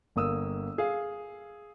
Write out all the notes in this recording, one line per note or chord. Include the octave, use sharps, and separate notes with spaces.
G1 A#3 D#6 E6
G#4 F5